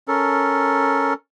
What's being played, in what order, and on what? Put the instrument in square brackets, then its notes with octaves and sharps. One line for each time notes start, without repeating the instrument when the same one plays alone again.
[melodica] C#4 A4 A#4